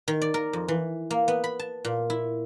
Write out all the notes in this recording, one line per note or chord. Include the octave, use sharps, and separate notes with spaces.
D#3
D5
A#4
F2
E3
A#3
B3
B5
A5
A#2
E4